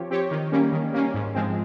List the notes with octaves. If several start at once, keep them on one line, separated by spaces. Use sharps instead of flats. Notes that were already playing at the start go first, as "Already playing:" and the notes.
Already playing: F3 C4 G4 C#5
C4 G4 C#5
D#3
G3 A#3 C#4
D#3
G3 A#3 C#4
G#2
F3 G#3 C4